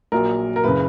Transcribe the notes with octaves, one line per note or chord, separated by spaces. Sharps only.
A#1 A#2 F#3 A#4
A#4
F#1 C#3 B4